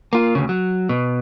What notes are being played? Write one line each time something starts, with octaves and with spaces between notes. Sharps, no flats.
A#3 F4
D2 C#3
F#3
B2